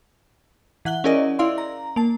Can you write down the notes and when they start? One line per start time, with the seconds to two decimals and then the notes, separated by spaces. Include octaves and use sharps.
0.85 E3 F#5 F#6 G7
1.04 C#4 E4 G#4 A#4 D5 D#5
1.39 E4 D5 F5 C6
1.58 A#5
1.96 A#3 A5